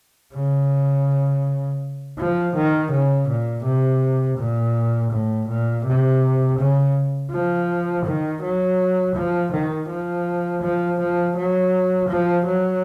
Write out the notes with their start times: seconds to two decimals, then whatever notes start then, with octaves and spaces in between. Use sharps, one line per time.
0.34 C#3
2.18 F3
2.55 D#3
2.92 C#3
3.28 A#2
3.64 C3
4.38 A#2
5.11 A2
5.48 A#2
5.85 C3
6.59 C#3
7.32 F3
8.05 D#3
8.43 F#3
9.15 F3
9.52 D#3
9.89 F3
10.62 F3
11.00 F3
11.36 F#3
12.09 F3
12.46 F#3